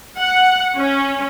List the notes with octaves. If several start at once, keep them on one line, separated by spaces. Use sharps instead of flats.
F#5
C#4